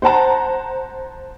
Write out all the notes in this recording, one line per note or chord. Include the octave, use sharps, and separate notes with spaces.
C5 F#5 A5 A#5